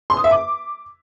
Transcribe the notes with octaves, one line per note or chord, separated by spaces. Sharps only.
C6
D#6
E5
D6